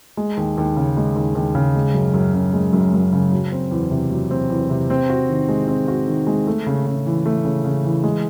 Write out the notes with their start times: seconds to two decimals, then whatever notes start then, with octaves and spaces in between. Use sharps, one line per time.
0.17 G#3
0.37 D#2
0.58 D#2
0.77 C#3
0.97 G#3
1.16 D#2
1.35 D#2
1.55 C#3
1.75 G#3
1.94 F#2
2.14 F#2
2.34 C#3
2.53 G#3
2.73 F#2
2.94 F#2
3.13 C#3
3.32 F#3
3.52 C4
3.71 E2
3.91 C3
4.11 F#3
4.31 C4
4.50 E2
4.70 C3
4.90 C4
5.09 F#4
5.29 D#3
5.49 G#3
5.68 C4
5.88 F#4
6.07 D#3
6.27 G#3
6.47 A3
6.66 C#3
6.86 C#3
7.06 E3
7.26 A3
7.45 C#3
7.64 C#3
7.85 E3
8.04 G#3